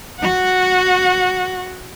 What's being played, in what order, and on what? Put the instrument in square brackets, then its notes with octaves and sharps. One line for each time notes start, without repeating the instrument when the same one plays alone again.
[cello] F#4 F#5